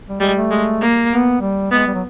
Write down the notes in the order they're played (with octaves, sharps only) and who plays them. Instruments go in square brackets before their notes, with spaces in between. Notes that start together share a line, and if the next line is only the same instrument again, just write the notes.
[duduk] G3
[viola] G3 [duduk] G#3
[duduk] A3
[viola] G#3
A#3
[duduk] B3
G3
[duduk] G#3 [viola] B3
[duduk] G3
F#3